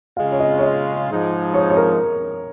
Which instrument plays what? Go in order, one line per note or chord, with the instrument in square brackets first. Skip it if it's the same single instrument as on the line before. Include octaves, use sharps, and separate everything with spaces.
[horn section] C#3 G#3 F4 [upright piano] F5
[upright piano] C#5
D#5
C#5
D#5
[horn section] G#2 F3 G#3 D#4
[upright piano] C#5
C#5
A#4